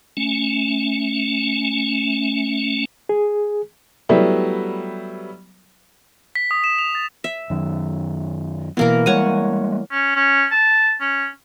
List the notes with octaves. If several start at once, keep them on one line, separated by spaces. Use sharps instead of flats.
A3 C#4
G#4
F#3 G3 A3 B3 E4
B6
D#6
E7
F7
A6
E5
F#2 D#3
B2 E3 A#3 B3 A#4
G3 G#3 A#3 C#5 F#5 G#5
C#4
C#4
A5
C#4